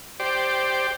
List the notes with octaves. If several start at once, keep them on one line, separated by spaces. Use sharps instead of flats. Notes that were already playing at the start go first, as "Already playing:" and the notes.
G4 C5 D5